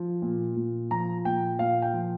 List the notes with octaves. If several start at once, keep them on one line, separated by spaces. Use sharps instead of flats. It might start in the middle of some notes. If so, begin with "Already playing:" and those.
Already playing: F3
A#2
A#2
F3 A#5
A#2 G5
A#2 F5
G5
F3